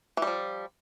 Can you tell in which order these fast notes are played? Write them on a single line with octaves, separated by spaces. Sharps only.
E3 G3 F3